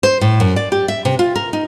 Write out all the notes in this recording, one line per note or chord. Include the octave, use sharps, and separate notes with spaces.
C5
A2
F#2
D5
G4
E5
C3
F4
A#4
D#4